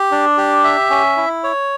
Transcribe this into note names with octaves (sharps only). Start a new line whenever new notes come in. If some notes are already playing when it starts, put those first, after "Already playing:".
Already playing: G4
D4
G4
E5
C#4
E4
C#5